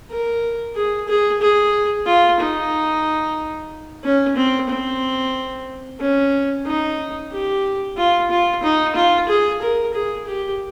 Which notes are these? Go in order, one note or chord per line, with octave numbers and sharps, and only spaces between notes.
A#4
G#4
G#4
G#4
F4
D#4
C#4
C4
C4
C#4
D#4
G4
F4
F4
D#4
F4
G#4
A#4
G#4
G4